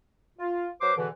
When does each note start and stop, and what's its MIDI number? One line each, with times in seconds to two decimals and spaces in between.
0.39 0.69 65
0.81 0.92 54
0.81 0.92 71
0.81 0.92 72
0.81 0.92 84
0.81 0.92 86
0.97 1.08 40
0.97 1.08 47
0.97 1.08 50
0.97 1.08 52